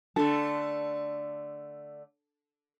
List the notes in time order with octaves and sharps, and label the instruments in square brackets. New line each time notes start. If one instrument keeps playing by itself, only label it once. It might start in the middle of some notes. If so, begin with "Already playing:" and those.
[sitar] D3 A3 [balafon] D4 [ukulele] A4